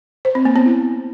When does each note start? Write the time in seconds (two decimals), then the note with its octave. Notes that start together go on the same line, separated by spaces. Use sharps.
0.25 C5
0.35 C4
0.45 A#3
0.56 B3
0.66 E4